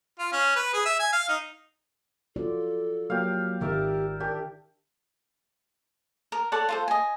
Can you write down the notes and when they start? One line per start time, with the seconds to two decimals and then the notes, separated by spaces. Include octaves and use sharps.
0.19 F4
0.33 C#4
0.56 B4
0.74 G#4
0.85 E5
1.00 G#5
1.13 F5
1.29 D#4
2.36 F4 F#4 A4 D5
3.10 F#3 A#3 G4 F5
3.61 G#1 D#3 G4 A#4 D5 E5
4.20 D4 G4 A#4 D5
6.32 A#4
6.52 A4 C#5 D5 F#5
6.69 F4 A4 C5
6.88 D#5 G#5